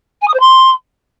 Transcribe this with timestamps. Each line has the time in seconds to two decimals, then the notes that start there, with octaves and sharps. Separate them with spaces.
0.22 G#5
0.28 D#6
0.34 C5
0.40 C6